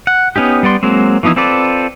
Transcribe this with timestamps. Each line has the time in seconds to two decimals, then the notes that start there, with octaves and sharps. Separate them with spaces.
0.07 F#5
0.36 B3 C#4 D#4 G4
0.63 G3 B3 D5 C6
0.83 F#3 G#3 A#3 C4
1.23 E3 F3 B3 D#4 E4
1.36 C4 F4 A4 B4 D5